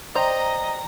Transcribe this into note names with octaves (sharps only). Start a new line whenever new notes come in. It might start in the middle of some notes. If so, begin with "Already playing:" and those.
C5 D5 D#5 G5 A#5